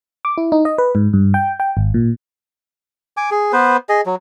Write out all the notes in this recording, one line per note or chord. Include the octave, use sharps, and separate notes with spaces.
D6
E4
D#4
D#5
B4
G#2
G2
G5
G5
G#1
A#2
G#5 D6
G#4
B3 B4 C5
G#4 D#5
F#3